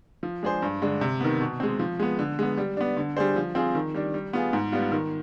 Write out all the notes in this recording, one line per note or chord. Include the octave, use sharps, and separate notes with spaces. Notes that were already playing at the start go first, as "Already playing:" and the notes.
F3
G#3 D4 G#4 C5
G2
D3 G#3 D4
C3
D#3 B3
B2
G#3 C4
F3
G#3 B3
D3
G#3 B3
G3
B3 D4
D3
G3 D4 G#4 C5
F3
C4 F4 G#4
D#3
G3 D4
G3
B3 F4 G#4
G#2
G3 B3 F4
D#3